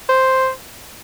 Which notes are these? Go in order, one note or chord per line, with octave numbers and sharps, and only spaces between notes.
C5